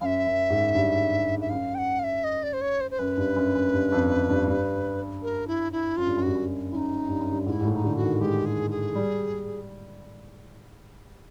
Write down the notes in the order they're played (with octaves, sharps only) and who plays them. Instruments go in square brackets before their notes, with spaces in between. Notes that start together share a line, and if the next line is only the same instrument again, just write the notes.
[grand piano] F#2 [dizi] E5 F5
[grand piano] F#2
G#2
G2
[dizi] E5
[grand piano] F#2 [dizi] F5
[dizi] G5
F#5
F5
E5
D#5
D5
C5
C#5
C5
C5
[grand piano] F#2 [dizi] B4
[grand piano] G2
F#2
F#2
G2
F2
F#2
G2
G2
[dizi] A#4
E4
E4
[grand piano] F#2 [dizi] F4
[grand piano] G2
F#2
[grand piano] G2 [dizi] F#4
[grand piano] F#2
[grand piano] F#2 [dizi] D#4 E4
[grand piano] G2
F#2
G2
[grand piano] G#2 [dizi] F4
[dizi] E4
[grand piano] G#2
A2
[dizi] E4
D#4
[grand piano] D3
[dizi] F#4
[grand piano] D#3
[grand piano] G#3 [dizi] G4
[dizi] G#4
G#4
[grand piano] G3